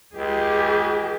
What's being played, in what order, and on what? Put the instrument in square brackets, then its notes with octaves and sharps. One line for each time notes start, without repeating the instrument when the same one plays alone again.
[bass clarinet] C#2 [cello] G4 G#4